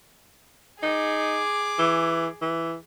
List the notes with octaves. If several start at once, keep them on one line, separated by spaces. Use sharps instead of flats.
D#4 G#4 D6
E3
E3